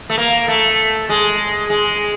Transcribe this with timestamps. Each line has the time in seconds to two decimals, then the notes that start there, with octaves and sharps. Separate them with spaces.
0.10 A3
0.18 A#3
0.48 A3
1.09 G#3
1.70 G#3